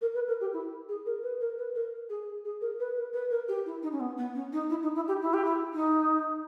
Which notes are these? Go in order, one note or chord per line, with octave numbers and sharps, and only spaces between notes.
A#4
B4
A#4
G4
E4
G#4
A#4
B4
A#4
B4
A#4
G#4
G#4
A#4
B4
A#4
B4
A#4
G4
E4
D#4
C#4
B3
B3
C#4
D#4
E4
D#4
E4
G4
E4
G4
E4
D#4